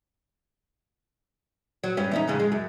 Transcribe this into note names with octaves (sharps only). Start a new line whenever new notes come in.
F#3
G2 C#4
E2 C#4 D#4
F2 G#2 C#3
G#3
F#2